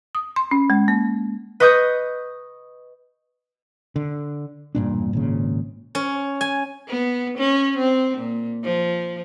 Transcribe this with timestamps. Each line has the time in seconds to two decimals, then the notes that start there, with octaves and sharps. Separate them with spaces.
0.15 D#6
0.36 C6
0.51 C#4
0.70 G#3
0.88 A#3
1.60 B4 D#5 C#6 D#6 G6
3.96 D3
4.75 E1 G2 A#2 D4
5.13 G#1 A#2 C#3
5.95 C#4
6.41 G#5
6.88 B3
7.39 C#4
7.78 C4
8.18 A#2
8.64 F3